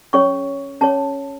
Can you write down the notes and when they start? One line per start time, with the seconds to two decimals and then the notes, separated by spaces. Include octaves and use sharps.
0.13 C#4 G#4 C#5 C#6
0.81 C#4 G#4 C#5 A5